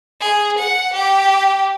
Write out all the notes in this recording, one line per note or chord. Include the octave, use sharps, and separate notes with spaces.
G#4
F#5
G4